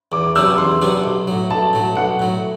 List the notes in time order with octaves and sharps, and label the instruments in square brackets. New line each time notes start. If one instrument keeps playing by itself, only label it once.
[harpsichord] E2 [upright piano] D6
[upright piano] D6
[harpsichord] C3 F#3 B3 D4 [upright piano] E6
[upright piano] D6
[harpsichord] E2 [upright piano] C6
[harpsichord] C3 F#3 B3 D4
B1
A2 F#3
[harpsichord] B1 [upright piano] A5
[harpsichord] A2 F#3
[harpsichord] B1 [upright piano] F#5
[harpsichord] A2 F#3